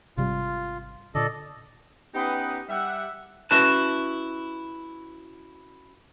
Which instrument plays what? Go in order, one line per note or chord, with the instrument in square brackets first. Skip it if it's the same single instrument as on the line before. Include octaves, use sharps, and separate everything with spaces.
[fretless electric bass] G#1 C3 G3 [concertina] F4
[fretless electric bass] A#2 D3 [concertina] A4 D5 D#5
[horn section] B3 C#4 D#4 G4 B4
G3 E5 F#5
[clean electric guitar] C#4 E4 F#4 B4 A5